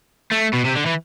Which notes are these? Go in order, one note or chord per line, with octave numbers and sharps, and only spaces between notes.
A3
B2
C3
D3
E3